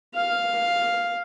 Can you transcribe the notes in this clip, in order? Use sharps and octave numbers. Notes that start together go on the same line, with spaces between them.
F5